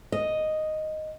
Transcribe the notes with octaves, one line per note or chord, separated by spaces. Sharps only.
D#5